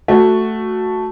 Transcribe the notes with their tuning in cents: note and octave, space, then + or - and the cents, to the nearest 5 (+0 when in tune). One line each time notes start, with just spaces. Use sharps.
A3 +0 F#4 +0